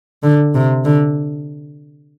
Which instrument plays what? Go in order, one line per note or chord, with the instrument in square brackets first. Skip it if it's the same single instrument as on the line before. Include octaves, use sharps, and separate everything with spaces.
[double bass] D3
C3
D3